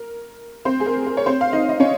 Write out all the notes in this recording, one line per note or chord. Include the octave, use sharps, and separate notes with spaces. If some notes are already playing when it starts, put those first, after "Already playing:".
Already playing: A#4
C4 C5
G#4
A#4
A#4
C#5
C4 C5
F5
D#4 D#5
D#5
C#4 C#5